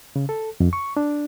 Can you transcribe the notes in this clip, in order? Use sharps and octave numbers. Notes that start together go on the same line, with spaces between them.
C#3
A4
F2
C#6
D4